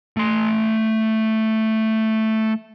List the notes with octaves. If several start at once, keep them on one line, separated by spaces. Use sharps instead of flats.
A3 C6